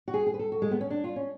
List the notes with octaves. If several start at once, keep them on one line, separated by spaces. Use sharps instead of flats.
F#4
G#4
G#4
B4
A4
F#4
G#3
B3
C#4
D4
F4
C#4